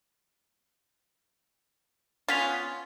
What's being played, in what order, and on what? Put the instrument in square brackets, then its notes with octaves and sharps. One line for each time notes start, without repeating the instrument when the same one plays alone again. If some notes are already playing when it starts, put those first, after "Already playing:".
[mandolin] B3 C#4 G#5 [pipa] F4 [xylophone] A6 B6 F7